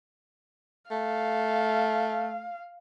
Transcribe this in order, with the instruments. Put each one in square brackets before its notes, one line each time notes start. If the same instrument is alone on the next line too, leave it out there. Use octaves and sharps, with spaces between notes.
[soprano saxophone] A3 [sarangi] F5